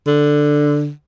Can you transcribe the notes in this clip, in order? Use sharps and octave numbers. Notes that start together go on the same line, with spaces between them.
D3